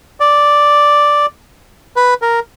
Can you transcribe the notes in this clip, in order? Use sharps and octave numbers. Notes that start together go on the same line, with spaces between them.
D5
B4
A#4